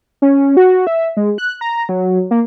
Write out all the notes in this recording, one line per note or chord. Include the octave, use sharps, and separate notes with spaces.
C#4
F#4
E5
G#3
F#6
A#5
F#3
A#3